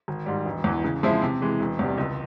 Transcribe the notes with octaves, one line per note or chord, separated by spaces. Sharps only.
G#1
G#2 G3
E1
E2 E3
C#3
F3 G#3 C4 E4
C3
E3 G#3
E1
E2 C3 G3
C#2